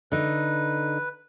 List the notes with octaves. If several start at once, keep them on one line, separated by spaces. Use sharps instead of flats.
D3 D#4 B4